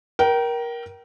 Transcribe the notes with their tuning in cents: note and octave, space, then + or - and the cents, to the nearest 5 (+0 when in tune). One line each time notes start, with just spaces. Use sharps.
A#4 +20 G5 -25